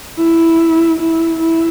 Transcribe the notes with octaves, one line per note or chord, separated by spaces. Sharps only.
E4
E4
E4